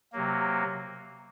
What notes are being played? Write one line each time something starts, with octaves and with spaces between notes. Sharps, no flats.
C3 F#3 A#3